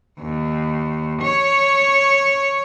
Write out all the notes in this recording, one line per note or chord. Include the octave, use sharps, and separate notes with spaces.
D#2
C#5